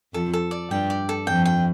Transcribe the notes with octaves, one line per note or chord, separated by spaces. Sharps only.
F2 F3 A4
A4
D5
G2 G3 G5
D5
A4
F2 F3 G5
G5